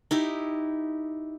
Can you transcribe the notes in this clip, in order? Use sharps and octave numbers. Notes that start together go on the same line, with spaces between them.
D#4 E4 G4